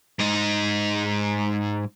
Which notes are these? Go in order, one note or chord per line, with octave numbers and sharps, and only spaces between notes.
G#2 D#4